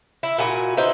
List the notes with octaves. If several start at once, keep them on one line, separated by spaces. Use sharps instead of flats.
E4
A#2 E4 F#4 G#5
D#4 E4 B4 C5